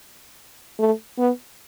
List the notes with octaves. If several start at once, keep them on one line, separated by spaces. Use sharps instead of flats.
A3
B3